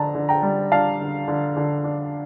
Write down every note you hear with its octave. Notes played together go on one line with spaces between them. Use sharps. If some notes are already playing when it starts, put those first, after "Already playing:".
Already playing: D3 D4 A5 A#5
D3
G5 A#5
G3
D4 F5 A5
D3
D3
D3
D4